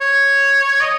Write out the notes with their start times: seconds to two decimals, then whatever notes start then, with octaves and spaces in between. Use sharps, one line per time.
0.01 C#5
0.80 D#5